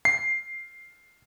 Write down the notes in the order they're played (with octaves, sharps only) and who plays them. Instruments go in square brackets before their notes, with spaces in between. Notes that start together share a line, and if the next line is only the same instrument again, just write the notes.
[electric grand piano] C7